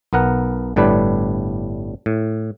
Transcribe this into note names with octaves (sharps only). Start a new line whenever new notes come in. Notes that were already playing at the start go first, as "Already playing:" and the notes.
B1 B3 A#4 F#5
G1 A2 G3 D4 B4
A2